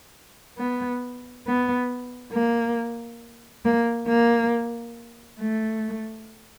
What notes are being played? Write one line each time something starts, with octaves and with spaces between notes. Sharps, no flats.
B3
B3
A#3
A#3
A#3
A3